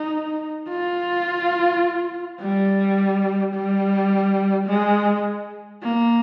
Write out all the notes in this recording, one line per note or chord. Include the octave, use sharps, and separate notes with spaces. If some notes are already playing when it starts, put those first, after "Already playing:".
Already playing: D#4
F4
G3
G3
G#3
A#3